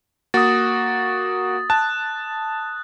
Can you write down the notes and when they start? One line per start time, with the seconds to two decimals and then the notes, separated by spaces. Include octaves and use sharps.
0.34 A#3 F#4 D#6 A6
1.70 A5 F#6